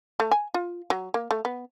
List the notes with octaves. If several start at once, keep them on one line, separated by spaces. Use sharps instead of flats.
A3
G#5
F4
F#3
A#3
A3
B3